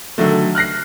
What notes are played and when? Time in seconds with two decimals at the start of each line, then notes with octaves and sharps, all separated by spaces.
0.18 D3 D#3 F#3 A3
0.55 F6 F#6 A#6 C7